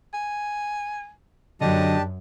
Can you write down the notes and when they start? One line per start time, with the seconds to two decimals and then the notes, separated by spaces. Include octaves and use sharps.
0.14 G#5
1.61 F#2 D3 F#3 D4 G4 D#5 A5